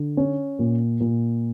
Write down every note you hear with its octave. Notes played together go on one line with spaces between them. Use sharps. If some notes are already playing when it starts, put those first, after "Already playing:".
Already playing: D3
C#4
A#2
A#2